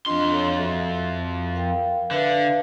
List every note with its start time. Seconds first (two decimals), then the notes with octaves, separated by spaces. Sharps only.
0.06 F2 D4 F4 D#5 C6
0.31 A4 C#5
0.56 F#4 A4 E5
1.54 A#4 F5 G5
2.11 D3 B4 E5 F5